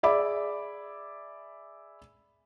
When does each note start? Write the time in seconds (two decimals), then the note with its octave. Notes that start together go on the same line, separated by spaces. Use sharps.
0.03 G#4 D5 E5 B5 D6